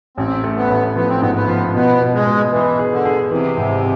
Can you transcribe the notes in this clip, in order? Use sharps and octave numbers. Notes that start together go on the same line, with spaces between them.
A1 C4
A3
B3
A1
F3 B3
C4
G#2 B3
B3
F3
B2 B3
B2
G#3
B2
E3 B3
G#4
D3
G#4
C3 E3
G#1